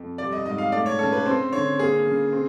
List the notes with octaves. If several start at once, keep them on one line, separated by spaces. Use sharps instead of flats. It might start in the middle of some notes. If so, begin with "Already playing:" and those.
Already playing: F2
G3 D5
D#5
G#2 D#5
F5
A3 D5
C#5
C#3 A4
B4
C4 C5
D3 C#5
A#3 G#4
C#3
C4